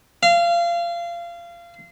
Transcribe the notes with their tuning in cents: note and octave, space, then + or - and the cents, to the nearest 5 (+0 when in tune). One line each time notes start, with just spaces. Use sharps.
F5 -25